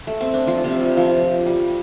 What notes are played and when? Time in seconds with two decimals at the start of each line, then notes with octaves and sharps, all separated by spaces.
0.07 A3
0.21 C4
0.34 D4
0.47 F3 F4
0.64 C3 C4
0.80 G3
0.97 F3
1.46 G3